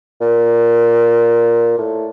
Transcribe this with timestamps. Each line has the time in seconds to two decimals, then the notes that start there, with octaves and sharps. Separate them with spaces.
0.21 A#2
1.78 A2